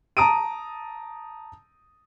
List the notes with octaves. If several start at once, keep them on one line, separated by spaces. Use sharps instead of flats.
A5 A#5 D#6 D7 D#7